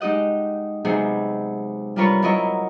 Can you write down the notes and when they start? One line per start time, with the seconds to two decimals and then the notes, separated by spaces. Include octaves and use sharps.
0.01 G#3 D#4 G4 D#5 F#5
0.85 C3 F#3 G#3 B3 D#4 G#4
1.96 G3 D4 F4 A#4 B4 C#5
2.22 F#3 C4 E4 A#4 C#5 D#5